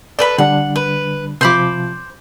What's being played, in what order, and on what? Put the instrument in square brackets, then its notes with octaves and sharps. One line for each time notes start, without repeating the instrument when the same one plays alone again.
[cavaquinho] A4 B4 B5 [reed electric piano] D5
[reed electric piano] D3 G3 D4 [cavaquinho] F#5
[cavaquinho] B4
[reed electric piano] C3 F3 [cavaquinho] C5 B5 D6